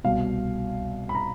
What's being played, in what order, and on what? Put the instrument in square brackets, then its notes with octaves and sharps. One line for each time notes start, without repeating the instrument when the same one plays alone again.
[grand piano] C2 B2 F5
B5
A#5